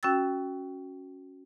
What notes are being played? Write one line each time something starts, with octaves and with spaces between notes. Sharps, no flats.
C#4 F#4 G5 E6 A6